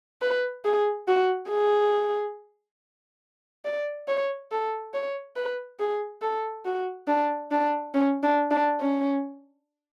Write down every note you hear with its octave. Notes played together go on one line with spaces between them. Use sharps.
B4
G#4
F#4
G#4
D5
C#5
A4
C#5
B4
G#4
A4
F#4
D4
D4
C#4
D4
D4
C#4